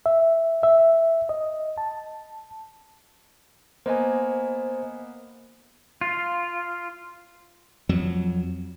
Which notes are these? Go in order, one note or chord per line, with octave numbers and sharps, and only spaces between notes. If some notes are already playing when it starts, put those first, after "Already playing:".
E5
E5
D#5
A5
A#3 B3 C5 D#5 G#5
F4
F2 F#3